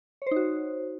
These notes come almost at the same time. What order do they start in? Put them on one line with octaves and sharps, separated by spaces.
C#5 C5 D#4 F#4